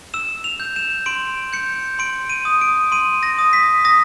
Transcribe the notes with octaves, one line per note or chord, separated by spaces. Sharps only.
E6 E7
F7
G6
E7
C6 D7
G6 C#7
C6 D7
D#7
D#6
D7
C6 D#7
A#6
D#6
B6
D#6 A#6